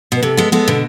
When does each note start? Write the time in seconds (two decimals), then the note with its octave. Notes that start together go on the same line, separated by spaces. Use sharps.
0.12 B2 B4
0.23 C3 A4
0.37 G#3 B3
0.52 G#3 B3 A4
0.68 B2 D3